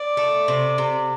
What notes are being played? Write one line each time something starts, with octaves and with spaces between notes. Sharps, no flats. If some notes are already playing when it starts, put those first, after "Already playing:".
Already playing: D5
A3
C3
C3